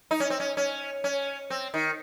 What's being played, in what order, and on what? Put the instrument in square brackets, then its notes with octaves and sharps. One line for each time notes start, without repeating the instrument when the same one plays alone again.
[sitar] D#4
C#4
C4
C#4
C#4
C#4
C4
D#3